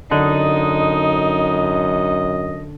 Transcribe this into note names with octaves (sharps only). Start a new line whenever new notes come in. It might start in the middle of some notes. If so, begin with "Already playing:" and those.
F#2 D3 D#4 D#5